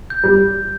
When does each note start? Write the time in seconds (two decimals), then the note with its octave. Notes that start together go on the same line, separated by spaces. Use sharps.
0.10 G6
0.24 G3